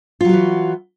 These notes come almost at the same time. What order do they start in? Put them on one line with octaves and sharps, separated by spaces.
F4 F#3 F#4 E3